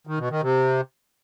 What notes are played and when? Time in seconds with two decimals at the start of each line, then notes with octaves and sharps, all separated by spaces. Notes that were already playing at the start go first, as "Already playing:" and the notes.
0.07 D#3
0.19 B2
0.31 D#3
0.42 C3